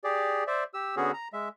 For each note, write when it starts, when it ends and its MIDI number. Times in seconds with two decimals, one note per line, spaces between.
0.04 0.44 67
0.04 0.44 68
0.04 0.44 74
0.47 0.64 72
0.47 0.64 74
0.47 0.64 76
0.74 0.95 67
0.74 0.95 88
0.97 1.12 50
0.97 1.12 59
0.97 1.12 61
0.97 1.12 66
0.97 1.12 68
1.14 1.28 82
1.33 1.49 56
1.33 1.49 76